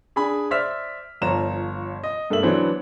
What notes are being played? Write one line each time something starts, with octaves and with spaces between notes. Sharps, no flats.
D4 G#4 G#5 B5
C5 D5 E5 E6 F6 B6
G1 F3 C#5 A#5 E7
D#5
G2 A3 A#3 E5 F#7
E3 F#3 B3 D4 C5